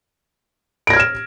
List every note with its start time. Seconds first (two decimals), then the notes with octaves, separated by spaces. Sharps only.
0.87 D7
0.90 A#6
0.93 G#6
0.96 F6
1.00 E7